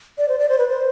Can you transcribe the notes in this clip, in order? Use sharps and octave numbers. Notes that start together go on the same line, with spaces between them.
D5
C5
D5
C5
B4
C5